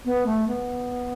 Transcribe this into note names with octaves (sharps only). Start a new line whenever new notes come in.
B3
A3
B3